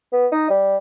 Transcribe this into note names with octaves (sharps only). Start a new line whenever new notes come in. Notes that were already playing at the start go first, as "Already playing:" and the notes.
B3
D#4
G3